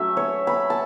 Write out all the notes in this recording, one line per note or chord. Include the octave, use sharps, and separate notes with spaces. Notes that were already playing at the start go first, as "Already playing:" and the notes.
Already playing: F#3 A3 C#4 E5
C#5
B5
A5